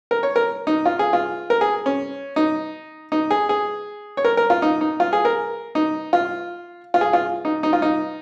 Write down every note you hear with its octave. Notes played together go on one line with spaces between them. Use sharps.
A#4
C#5
A#4
D#4
F4
G#4
F4
A#4
G#4
C#4
D#4
D#4
G#4
G#4
C#5
A#4
A#4
F4
D#4
D#4
F4
G#4
A#4
D#4
F4
F4
G#4
F4
D#4
D#4
F4
D#4